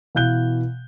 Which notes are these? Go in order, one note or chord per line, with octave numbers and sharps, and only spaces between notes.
B2 E3 F5 F#6 G6 G7